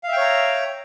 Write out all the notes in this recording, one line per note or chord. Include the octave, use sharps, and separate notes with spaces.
C#5 E5 F5 G5 A#5